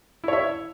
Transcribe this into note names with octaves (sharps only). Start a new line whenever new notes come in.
E4 C#5 E5